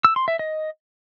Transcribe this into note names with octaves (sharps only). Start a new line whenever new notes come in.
E6
C6
E5
D#5